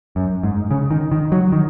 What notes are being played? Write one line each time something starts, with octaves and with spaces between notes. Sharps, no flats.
F#2
G#2
C#3
D#3
D#3
F#3
D#3